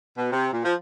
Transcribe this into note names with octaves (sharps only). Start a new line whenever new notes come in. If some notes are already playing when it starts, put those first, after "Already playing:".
B2
C3
A#2
F3